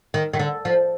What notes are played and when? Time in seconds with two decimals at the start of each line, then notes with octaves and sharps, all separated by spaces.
0.14 D#3
0.33 D#3
0.39 D3
0.65 F3